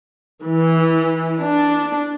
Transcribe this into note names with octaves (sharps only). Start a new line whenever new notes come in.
E3
D4